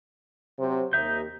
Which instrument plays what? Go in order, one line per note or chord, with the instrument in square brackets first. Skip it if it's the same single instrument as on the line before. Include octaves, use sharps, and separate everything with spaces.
[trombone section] C3 F#3 C5
[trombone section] D#2 [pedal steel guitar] D#4 E5 G6